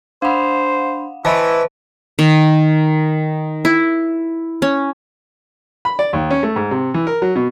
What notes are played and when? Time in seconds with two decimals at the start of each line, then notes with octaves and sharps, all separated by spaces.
0.22 D4 C5 F5 F#5 B5
1.25 E3 E4 C5 D#5 E5 A5
2.19 D#3
3.65 E4
4.62 C#4
5.85 B5
5.99 D5
6.13 D#2
6.30 C#4
6.43 A3
6.56 G#2
6.71 C3
6.94 E3
7.07 A#4
7.22 F#3
7.36 B2